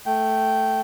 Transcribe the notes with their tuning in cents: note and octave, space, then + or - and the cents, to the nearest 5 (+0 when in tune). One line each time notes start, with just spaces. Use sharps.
A3 +0 G5 -15